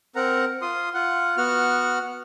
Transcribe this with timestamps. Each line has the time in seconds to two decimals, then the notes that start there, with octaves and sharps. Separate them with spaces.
0.16 C4 A#4 F#5 A#5
0.62 F4 C6 D#6
0.94 F4 F#5
1.37 B3 F#4 F#5 F6